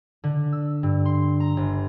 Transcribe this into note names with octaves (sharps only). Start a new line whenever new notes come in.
D3
E6
G2
C6
A#5
G1